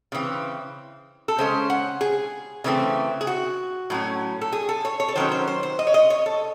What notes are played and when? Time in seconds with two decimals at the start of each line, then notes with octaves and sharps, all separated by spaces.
0.12 C#3 E3 C4
1.28 A4
1.38 C#3 G#3 C#4 C5
1.70 F#5
2.01 G#4
2.64 C#3 E3 A3 C4
3.21 G#4
3.27 F#4
3.90 A2 F#3 C#4
4.41 A4
4.52 G#4
4.69 A4
4.85 C#5
5.00 C#5
5.08 A4
5.16 D#3 F#3 C#4 C5
5.31 C5
5.48 C5
5.63 C5
5.79 D#5
5.87 C#5
5.94 D#5
6.10 C#5
6.26 A4